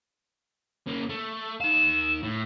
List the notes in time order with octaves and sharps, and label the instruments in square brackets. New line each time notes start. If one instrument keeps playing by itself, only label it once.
[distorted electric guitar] A#3 C#4
A3
[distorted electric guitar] D#4 F5 [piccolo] E7
[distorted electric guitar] A2